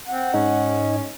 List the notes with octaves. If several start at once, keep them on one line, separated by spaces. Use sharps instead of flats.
C4 F#5
G#2 C#4 D#4